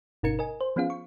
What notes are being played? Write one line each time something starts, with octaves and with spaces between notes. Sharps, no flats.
G1 B2 D#4 A#4 G#6 C#7
A#4 D#5 G#5
C5
F3 B3 C#4 F4 G#4 F5
C#6